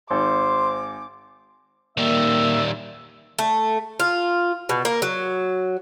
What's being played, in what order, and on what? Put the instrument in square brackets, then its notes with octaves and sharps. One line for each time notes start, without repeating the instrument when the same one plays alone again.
[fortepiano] G#1 [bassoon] C5 [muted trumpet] C6 [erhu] D6
[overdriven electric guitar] D#3 G3 [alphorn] A#3 [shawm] E5
[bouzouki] A3
F4
B2
A#3
F#3